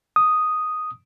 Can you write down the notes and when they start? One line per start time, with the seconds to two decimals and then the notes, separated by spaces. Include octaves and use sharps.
0.16 D#6